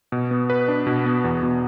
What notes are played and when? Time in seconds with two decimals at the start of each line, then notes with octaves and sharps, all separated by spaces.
0.12 B2
0.31 B3
0.50 B4
0.68 D4
0.87 B2
1.06 B3
1.24 E2
1.43 B2